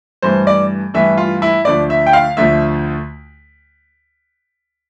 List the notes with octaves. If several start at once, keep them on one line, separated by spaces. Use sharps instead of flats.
G2 E3 A3 C5
D5
G2 E3 A3 E5
F4
E4
D2 D3 F3 A3 D5
E5
G5
F5
D2 D3 F3 A3 E5